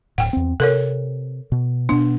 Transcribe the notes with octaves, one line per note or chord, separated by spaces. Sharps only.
D1 A2 F#5 G5
E2 C4
C3 A4 A#4 C#5
B2
B2 B3 D4